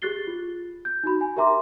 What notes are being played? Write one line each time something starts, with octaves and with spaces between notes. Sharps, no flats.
G4 G#4 F#6 A6 C7 G7
F4
G6
D#4 F#4 B5
G#5
G4 A#4 E5 A#5 C6 D6